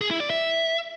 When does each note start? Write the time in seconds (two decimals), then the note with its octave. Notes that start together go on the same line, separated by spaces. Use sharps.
0.01 G#4
0.11 E4
0.20 D5
0.30 E5